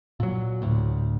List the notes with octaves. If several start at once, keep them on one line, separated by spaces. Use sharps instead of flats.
A#2 F#3
D2 A2